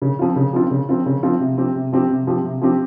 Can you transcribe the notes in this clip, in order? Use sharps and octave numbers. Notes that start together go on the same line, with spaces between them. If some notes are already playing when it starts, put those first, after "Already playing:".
C#3
F3 C4 F4
C#3
F3 C4 F4
C#3
F3 C4 F4
C#3
F3 C4 F4
C3
F3 C4 G4
C3
F3 C4 G4
C3
F3 C4 G4
C3
F3 C4 G4